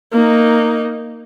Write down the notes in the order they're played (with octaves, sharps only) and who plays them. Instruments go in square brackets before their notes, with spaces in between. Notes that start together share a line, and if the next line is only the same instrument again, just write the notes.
[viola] A#3 D#4